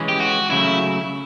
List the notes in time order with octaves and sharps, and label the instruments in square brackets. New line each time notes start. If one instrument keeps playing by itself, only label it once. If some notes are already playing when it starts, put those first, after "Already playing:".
Already playing: [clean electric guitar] E3 G#3 C#4
[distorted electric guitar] G4
F#4
[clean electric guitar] C#3 F#3 A3 [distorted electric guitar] E4